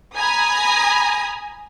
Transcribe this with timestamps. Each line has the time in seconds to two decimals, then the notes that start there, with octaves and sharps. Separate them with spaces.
0.15 G#5 A#5 B5 D#6